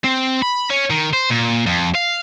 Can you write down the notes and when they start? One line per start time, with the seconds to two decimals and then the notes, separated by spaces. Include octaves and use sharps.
0.04 C4
0.42 B5
0.70 C#4
0.90 D#3
1.13 C5
1.30 A#2
1.66 F2
1.95 F5